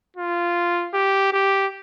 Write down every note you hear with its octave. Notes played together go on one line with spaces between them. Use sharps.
F4
G4
G4